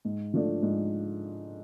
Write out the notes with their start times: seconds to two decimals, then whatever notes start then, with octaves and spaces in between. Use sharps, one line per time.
0.05 G#2
0.34 F3 A3 D4
0.63 G#2